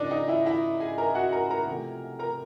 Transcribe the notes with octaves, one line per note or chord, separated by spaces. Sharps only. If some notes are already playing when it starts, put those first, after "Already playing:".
Already playing: C#3 F3 A#3 D4 D#4 D5 D#5
D#4 D#5
E4 E5
E4 E5
G#4 G#5
A#4 A#5
F#4 F#5
A#4 A#5
A#4 A#5
C3 F3 A3
A#4 A#5